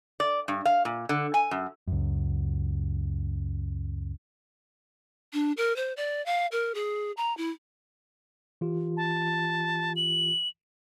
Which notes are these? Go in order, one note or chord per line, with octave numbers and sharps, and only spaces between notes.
D5
G2
F5
A#2
D3
G#5
F#2
C#2 F#2
D4
A#4
C5
D5
F5
A#4
G#4
A#5
E4
E3 F4 G4
A5
F#7